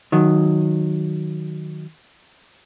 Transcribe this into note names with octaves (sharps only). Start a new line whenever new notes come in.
D#3 F#3